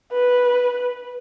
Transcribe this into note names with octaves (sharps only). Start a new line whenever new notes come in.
B4